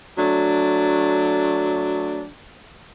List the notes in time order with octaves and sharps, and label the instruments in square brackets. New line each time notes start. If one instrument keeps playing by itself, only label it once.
[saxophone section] F#3 A3 D4